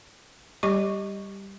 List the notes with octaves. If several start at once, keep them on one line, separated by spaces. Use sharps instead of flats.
G3 G4 D#5 C#6